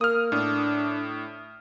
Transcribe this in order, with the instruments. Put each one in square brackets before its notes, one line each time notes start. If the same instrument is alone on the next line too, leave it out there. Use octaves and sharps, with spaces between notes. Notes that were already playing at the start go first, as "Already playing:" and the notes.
[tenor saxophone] A#3 [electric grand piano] D#6 F6
[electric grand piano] A2 [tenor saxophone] D4